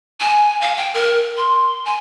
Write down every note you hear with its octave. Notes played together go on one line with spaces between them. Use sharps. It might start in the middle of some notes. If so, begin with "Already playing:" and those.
G#5
F5
G5
A#4
C6
G#5